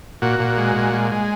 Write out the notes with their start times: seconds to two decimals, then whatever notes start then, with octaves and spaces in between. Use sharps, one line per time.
0.22 A#2 F#4
0.40 A#2
0.58 G#3
0.76 A#2
0.94 G#3
1.12 G#3